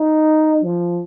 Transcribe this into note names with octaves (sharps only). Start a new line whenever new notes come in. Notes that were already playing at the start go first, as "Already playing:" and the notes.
Already playing: D#4
F3